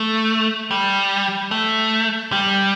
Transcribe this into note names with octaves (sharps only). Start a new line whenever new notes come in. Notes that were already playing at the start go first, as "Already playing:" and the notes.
Already playing: A3
G3
A3
G3